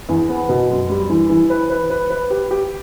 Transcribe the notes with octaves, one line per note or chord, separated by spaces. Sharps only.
E2
B3
B2
F#2
G3
E3
E3
B4
B4
B4
B4
G4
G4